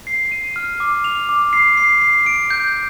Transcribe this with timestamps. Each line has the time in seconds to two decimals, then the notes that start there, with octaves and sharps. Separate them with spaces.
0.07 C7
0.32 D#7
0.56 F6
0.80 D6
1.04 F7
1.29 D6
1.53 C7
1.77 C7
2.02 C7
2.26 D7
2.50 G6